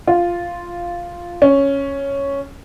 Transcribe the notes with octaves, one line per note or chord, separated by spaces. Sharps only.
F4
C#4